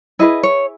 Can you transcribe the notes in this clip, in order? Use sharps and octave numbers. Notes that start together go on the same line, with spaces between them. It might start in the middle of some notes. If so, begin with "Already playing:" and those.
E4 G#4 B4 D#5
C#5